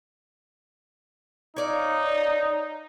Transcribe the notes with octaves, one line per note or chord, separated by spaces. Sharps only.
D#4 C#5 D5 F5